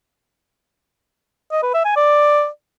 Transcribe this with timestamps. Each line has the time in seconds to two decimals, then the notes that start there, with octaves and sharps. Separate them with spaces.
1.52 D#5
1.63 B4
1.74 E5
1.85 G#5
1.96 D5